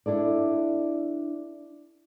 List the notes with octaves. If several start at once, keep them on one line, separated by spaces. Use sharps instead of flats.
D4 E4 A4 D5